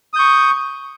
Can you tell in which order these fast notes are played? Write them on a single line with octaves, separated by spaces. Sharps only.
D#6 G6 C#6